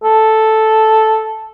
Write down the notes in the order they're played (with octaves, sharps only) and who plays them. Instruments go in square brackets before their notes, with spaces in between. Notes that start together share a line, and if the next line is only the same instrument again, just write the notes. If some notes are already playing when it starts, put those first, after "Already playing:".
[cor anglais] A4